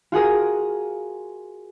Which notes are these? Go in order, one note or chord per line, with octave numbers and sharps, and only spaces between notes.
F4 F#4 G#4 A#4